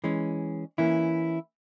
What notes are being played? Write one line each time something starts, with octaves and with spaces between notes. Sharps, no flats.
E3 G#3 C#4
E3 A#3 C#4 E4